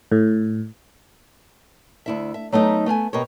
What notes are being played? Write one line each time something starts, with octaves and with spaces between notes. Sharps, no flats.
A2
D2 E4 E5
E5
F#3 A3 B3 D#4
A3 B3 F5 G#5
B2 G4 A#4 C#5